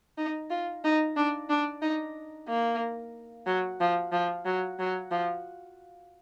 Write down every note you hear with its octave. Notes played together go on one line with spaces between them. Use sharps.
D#4
F4
D#4
D4
D4
D#4
A#3
F#3
F3
F3
F#3
F#3
F3